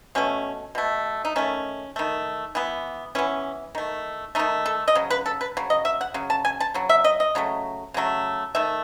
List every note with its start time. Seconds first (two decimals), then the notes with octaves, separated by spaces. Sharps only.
0.15 B2 A3 C#4
0.75 B2 A3
1.25 D#4
1.36 D#3 A3 C#4
1.96 D#3 A3
2.55 E3 B3
3.15 E3 B3 C#4
3.75 D#3 A3
4.35 D#3 A3 D#4
4.66 A4
4.88 D#5
4.95 C#3 F#3
5.10 B4
5.26 A4
5.41 B4
5.57 C#3 F#3
5.70 D#5
5.85 E5
6.01 F#5
6.14 C#3 F#3
6.30 A5
6.45 G#5
6.60 A5
6.74 C#3 F#3
6.89 E5
7.04 D#5
7.20 D#5
7.35 C#3 F#3 A3
7.94 C#3 F#3 A3
8.55 D#3 A3 E5